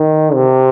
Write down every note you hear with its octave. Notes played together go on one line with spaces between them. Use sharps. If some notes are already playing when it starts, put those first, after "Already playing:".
Already playing: D#3
C3